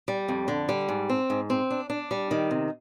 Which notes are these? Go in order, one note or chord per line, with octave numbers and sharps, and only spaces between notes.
G3
F2
D3
G3
G#2
C4
G#2
C4
D4
D4
G3
D#3
C3